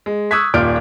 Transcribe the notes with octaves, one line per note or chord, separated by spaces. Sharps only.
G#3
C#6 D#6 E6 F#6 G#6 B6
D#1 A#2 D5 F6 G6 D7